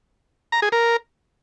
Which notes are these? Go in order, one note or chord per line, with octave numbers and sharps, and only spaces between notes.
A#5
G#4
A#4